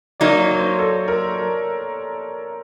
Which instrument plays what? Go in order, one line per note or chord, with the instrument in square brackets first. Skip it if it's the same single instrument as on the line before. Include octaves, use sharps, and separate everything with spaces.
[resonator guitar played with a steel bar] F#3 A#3 D#4 [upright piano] D5
[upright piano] C#5
C#5
C5
A4
A#4